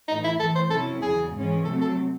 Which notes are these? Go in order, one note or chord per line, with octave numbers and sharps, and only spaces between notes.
A2 E3 A3 D#4
E4
A2 E3 A3 A4
C5
C3 F#3 C#4 E4 A4
E2 C#3 F#3 G#4
G#2 E3 G#3 C#4
C3 F#3 A3 C4 A4
A4